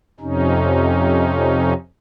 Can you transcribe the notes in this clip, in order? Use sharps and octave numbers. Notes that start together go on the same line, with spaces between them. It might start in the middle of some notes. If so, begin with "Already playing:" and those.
F2 C3 C#4 D#4